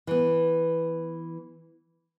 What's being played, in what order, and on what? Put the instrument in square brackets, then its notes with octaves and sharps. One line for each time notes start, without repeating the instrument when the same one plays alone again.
[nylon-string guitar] E3 B3